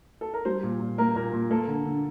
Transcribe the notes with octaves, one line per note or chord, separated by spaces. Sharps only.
A4
A#4
G3 C5
A#2
A#2
A#3 A#4
A#2 A#4
A#2
A#3 A4
D3
D3